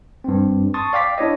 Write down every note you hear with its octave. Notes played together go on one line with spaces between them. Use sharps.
G2 C4
A5 C6 C#6 D#6 A6
D5 F5 G5 D6 B6
D4 E4 C#5 D#5